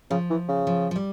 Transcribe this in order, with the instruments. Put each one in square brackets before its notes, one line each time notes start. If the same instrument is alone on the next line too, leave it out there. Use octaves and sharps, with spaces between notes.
[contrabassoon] C#3 [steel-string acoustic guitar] F3
[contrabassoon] E3
C#3
[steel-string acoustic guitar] F3
F3
G3